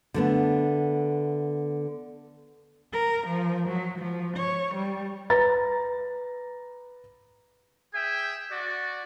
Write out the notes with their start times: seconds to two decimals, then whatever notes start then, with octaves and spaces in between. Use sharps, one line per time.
0.14 D3 A3 B3
2.92 A#4
3.27 F3
3.69 F#3
3.99 F3
4.37 C#5
4.75 G3
5.30 B4 A#5 A6
7.93 G#4 E5 G5 G#5
8.51 F#4 D5